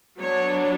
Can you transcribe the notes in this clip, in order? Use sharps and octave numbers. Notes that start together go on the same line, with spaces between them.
F#3 B3 D4 C#5